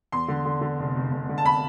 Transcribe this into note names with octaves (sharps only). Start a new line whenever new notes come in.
E2 C6
D3
D3
D3
F1
F1
F1
D3
A5
B5